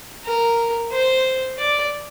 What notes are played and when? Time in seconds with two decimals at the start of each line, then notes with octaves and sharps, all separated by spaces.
0.25 A#4
0.92 C5
1.58 D5